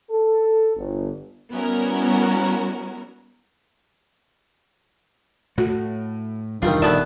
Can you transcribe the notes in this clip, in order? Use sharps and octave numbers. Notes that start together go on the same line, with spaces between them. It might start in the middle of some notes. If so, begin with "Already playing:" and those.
A4
G1
G3 B3 C#4 E4 F#4 A#4
A2 A3 F#4
E2 G2 C3 D#3 G3 D4 F4 F5
D#1 B3 A4 D5 E5 A5